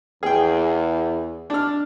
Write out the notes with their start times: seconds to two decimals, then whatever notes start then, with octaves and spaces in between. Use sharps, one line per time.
0.23 E2 G#4 G5
1.50 D4 F6